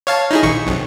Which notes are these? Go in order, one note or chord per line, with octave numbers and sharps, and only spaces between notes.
C#5 F5 A5
D#4 E4 G#4
A#1 D#3 C#6
B1 F2